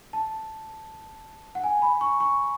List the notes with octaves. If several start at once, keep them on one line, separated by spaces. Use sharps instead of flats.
A5
F#5
G#5
B5
C#6
C#6